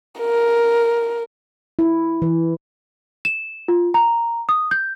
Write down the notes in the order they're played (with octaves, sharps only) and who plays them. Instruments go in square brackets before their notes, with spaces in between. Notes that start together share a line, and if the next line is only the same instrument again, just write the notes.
[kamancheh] A#4
[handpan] E4
E3
[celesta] E7
F4
A#5
D#6
G6